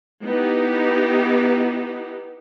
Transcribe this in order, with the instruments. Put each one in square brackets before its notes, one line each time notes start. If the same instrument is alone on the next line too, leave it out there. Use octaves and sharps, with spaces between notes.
[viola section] B3 D#4 E4 G4